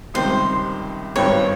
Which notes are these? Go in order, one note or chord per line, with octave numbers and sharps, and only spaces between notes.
C#2 C3 D#3 G3 C5
G#1 G2 D#3 G3 C4 C#5